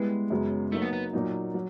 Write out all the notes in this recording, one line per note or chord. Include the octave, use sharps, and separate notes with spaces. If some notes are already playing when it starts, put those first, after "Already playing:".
Already playing: G3 G#3 B3 E4 G4 B4
F#2 C#3 F#3 B3
F#3 A3 A#3 D#4
B3
B3
A#2 F#3 A#3 D#4
F#3